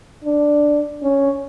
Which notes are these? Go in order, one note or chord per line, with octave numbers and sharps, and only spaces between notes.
D4
C#4